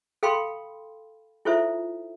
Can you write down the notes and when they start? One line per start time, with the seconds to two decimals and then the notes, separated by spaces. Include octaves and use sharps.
0.23 A4 F5 G5 B5 C6
1.45 E4 F4 A4 C5 E5